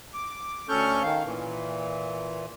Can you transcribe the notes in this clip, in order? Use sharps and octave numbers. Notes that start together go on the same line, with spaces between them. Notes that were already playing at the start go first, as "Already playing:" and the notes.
D6
D2 C#4 A4 C#6 F6 G6
D#3 F5
A#2 E3